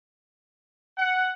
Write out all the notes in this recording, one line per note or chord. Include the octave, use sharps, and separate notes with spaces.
F#5